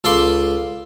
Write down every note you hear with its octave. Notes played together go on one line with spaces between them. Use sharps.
C#2 A4 F5 B5 C6 D6